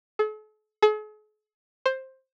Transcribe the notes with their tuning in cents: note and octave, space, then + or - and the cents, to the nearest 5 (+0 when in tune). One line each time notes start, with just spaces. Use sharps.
A4 -45
G#4 +45
C5 +10